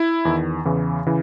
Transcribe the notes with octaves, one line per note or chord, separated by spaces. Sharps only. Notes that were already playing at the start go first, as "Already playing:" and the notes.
Already playing: E4
E2 D#3
E2 C#3 E3
C#3 E3